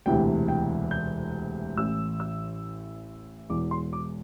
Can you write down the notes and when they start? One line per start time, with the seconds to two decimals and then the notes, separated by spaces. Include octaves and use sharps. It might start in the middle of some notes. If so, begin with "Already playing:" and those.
0.06 E1 D2 C3 E3 G5
0.48 G5
0.91 G6
1.77 A1 A2 E3 E6
2.20 E6
3.49 E1 E2 E3 D6
3.71 C6
3.93 D6